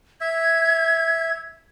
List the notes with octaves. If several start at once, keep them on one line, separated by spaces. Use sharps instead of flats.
E5 G#6